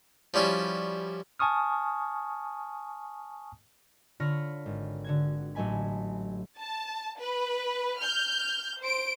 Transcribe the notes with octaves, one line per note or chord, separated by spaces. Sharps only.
F3 G3 C#4 E4 F#4
G#5 A5 C#6 D#6 F6
D3 F4 C#5 B5 F6 A#6
G#1
D3 F#4 G#6
A1 F#3 A3 D#5 G#5 B5
A5
B4
F6 G6
C5 D7